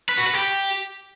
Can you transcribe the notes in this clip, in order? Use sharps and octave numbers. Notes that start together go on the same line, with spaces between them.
B4
F#4
B4
G4